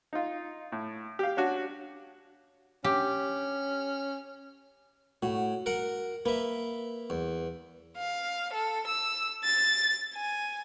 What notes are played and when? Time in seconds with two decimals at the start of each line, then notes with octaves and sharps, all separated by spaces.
0.13 D#4 F4
0.72 A2
1.19 G4 F5
1.37 C#4 D4 F#4
2.84 C#4 G4
5.23 A2 F#4
5.66 A#4 F#5
6.26 A#3 B4 E5
7.10 E2
7.98 F5
8.54 A4
8.88 E6
9.44 A6
10.14 G#5